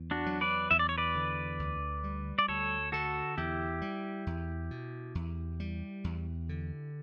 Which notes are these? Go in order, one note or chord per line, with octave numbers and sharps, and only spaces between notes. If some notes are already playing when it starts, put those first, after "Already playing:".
Already playing: E2
D4 F#4
F#3
B4 D5
E2 E5
D5
C#5
B4 D5
D3
D2
G3
D5
D2 A4 C#5
D3 F#4 A4
E2 E4 G4
G3
E2
B2
E2
G3
E2
D3